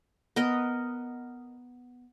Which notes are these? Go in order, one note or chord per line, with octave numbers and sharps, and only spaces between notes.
B3 A#4 D#5